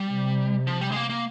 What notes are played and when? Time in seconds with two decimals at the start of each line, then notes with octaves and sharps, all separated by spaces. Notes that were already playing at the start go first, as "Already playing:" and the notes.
Already playing: G3
0.10 C3
0.67 F3
0.81 G3
0.92 G#3
0.96 A#3
1.10 A#3